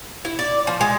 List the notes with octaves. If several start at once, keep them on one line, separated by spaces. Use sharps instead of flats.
E4
D5
F3
G#3